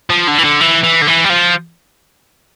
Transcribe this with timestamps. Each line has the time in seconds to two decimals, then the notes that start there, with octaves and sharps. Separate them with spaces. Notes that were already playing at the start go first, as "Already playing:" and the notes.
0.10 F3
0.27 D3
0.38 E3
0.44 D3
0.61 E3
0.84 E3
1.02 D3
1.07 E3
1.24 G3
1.30 F3